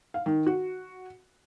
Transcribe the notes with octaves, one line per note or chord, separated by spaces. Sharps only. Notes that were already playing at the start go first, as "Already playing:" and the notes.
F5
D#3
F#4